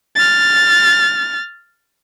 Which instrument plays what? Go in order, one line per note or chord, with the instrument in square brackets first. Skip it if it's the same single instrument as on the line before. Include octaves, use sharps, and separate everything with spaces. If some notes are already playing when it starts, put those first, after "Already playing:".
[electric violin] F6 A6